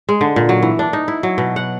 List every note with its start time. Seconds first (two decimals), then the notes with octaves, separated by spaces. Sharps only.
0.09 G#3
0.21 D3
0.36 A#2
0.49 F#3
0.63 E3
0.79 D4
0.93 D#4
1.08 E4
1.23 F#3
1.38 B2
1.56 F#5